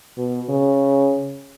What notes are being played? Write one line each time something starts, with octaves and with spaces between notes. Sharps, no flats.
B2
C#3